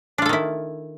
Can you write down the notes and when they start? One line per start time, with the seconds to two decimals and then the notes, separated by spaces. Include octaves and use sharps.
0.18 D4
0.22 F4
0.26 A4
0.29 D#3
0.33 E4